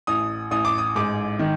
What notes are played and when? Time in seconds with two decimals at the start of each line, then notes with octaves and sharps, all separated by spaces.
0.07 A1 D#6
0.51 A1 D#6
0.65 D6
0.78 D#6
0.96 G#2 D6
1.39 D#3